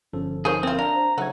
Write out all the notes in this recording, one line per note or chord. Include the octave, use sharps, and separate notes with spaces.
G1 F3 C#4 A4
D#4 G#4 A#4 C5 C#5
E3 C4 F4
D4 F5 A#5
C5
C#3 F#3 A3 D#4 F#5 G#6